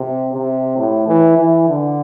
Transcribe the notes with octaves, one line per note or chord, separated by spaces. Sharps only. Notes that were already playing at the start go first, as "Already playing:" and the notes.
Already playing: C3
C3
A2
E3
E3
D3